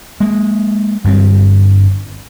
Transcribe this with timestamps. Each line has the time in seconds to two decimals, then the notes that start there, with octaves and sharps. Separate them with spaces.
0.20 G#3 A#3
1.04 G1 G2 G3 C4